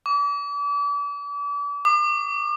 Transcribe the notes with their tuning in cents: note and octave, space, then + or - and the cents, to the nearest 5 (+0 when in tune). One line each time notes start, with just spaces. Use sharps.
D6 -40
D6 +40